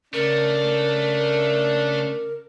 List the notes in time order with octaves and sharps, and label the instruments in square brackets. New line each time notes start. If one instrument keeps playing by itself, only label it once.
[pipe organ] C#3 [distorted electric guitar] A3 [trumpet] D4 [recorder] A#4